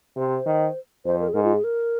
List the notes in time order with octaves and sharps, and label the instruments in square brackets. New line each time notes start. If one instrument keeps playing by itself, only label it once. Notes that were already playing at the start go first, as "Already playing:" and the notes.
[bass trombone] C3 [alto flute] C5
[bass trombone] D#3
[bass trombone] F2 [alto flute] C5
[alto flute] A#4
G#4
[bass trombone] G#2 [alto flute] A#4
[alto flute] F4
G#4
A#4